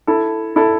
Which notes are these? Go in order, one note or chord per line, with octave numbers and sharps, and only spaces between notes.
E4 A4
E4 A4